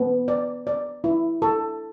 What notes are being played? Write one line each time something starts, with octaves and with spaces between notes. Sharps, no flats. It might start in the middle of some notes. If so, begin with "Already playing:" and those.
Already playing: B3
D5
D5
E4
A4